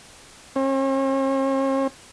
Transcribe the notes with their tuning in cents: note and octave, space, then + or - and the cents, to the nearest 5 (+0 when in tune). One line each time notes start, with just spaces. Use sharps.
C#4 -45